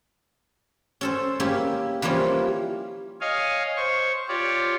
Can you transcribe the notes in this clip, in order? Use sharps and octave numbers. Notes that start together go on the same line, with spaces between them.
C#4 A4 C5
A#3 C#4 E4 G4
E3 F3 G3 A#3 C#4
C#5 D#5 F5 G#5
C5 C#6
F4 G4 C#5 D5